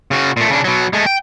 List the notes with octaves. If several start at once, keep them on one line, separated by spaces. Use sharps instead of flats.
C#3 F#4
A#2 A3
C#3 D4
B2 F#3
G#3 A3
G5